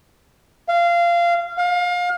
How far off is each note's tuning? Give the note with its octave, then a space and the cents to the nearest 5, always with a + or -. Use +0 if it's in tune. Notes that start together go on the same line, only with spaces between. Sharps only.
F5 -20
F5 +30